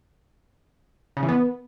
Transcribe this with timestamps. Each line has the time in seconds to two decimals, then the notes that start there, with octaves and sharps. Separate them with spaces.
1.17 C#3
1.23 E3
1.29 B3